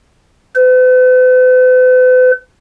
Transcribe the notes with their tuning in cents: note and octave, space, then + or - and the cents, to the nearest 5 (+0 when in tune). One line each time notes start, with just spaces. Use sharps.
B4 +45